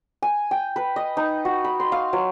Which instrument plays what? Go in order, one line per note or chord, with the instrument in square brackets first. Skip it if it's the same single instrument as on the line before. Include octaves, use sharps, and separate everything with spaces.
[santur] G#5
G5
B4
D#5
D#4
F#4
B5
C6
F5
F#3